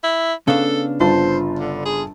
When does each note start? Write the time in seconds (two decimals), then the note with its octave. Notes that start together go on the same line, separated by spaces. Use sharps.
0.03 E4
0.48 C#3 B3 D4 A4 F5
1.00 G1 F4 C5 A5
1.59 D3
1.85 G#4